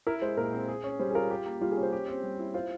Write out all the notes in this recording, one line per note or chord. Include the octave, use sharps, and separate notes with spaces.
E4 A#4
G#3 C5
A#2 A#4
C4
G#4
C#4
G3 C5
G#4
F4 A#4
G4
A#3
G3 F4
G#4
C#4
C5
G4
C4
G3
E4
F4 C5